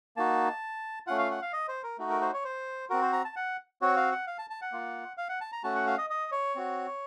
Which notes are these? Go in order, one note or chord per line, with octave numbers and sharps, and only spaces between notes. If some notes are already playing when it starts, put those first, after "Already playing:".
A#3 D#4 F#4 A5
A3 C#4 F4 F#5
F5
F#5
F5
D#5
C5
A#4
A3 D#4 F#4
A#4
C5
C#5
C5
C4 F#4 A#4
C5
A#5
A5
F#5
C4 F#4 C#5
F5
F#5
F5
A5
A5
F#5
A#3 F4
F5
F#5
A5
A#5
A3 C#4 F#4 A5
F#5
F5
D#5
D#5
C#5
C4 F#4